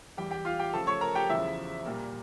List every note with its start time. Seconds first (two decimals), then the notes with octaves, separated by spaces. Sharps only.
0.17 E2 E3 G3 G4 G5
0.31 G4 G5
0.45 F4 F5
0.60 G4 G5
0.73 C#3 F3 A3 A4 A5
0.87 C#5 C#6
1.01 A#4 A#5
1.15 G4 G5
1.29 E2 C#3 F3 E4 E5
1.85 A#2 G3 A#3